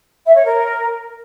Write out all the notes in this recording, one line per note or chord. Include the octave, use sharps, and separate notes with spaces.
E5
C#5
A#4